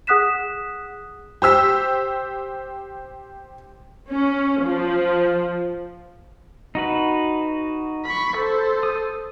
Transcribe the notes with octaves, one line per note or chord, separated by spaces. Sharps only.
G#4 F#5 D#6 F#6 B6 E7
G4 C5 E6 B6
C#4
F3
D#4 F#4 B4
B5 C#6
A4 C5
D#6